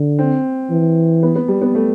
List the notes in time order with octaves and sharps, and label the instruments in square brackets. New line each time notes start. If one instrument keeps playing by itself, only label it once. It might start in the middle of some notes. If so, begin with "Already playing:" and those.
Already playing: [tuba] D3
[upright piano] C4
[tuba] E3
[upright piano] B3
B3
G3
B3
A3